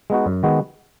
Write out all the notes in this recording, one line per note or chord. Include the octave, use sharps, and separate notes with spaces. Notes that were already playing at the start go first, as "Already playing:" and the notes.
G#3 B3 D#4 F#4
F#2
D#3 G#3 B3 F#4